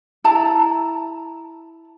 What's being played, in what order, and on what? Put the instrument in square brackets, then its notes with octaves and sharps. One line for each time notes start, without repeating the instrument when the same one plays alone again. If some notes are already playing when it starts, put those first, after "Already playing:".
[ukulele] E4 A5 A#5